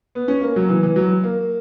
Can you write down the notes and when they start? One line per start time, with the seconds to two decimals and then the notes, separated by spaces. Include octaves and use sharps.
0.15 B3
0.28 C#4
0.41 A#3
0.56 F#3
0.69 E3
0.83 E3
0.96 F#3
1.24 A#3